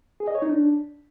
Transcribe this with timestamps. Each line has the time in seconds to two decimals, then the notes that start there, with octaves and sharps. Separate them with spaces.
0.20 G#4
0.28 D#5
0.35 C#5
0.42 D#4
0.49 D4